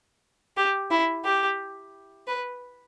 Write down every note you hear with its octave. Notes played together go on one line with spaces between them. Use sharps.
G4
E4
G4
B4